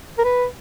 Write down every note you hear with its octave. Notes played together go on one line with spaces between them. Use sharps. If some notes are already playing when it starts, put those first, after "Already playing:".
A#4
B4